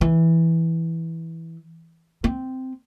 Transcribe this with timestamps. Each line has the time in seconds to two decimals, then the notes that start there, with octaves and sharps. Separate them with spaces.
0.01 E3
2.24 C4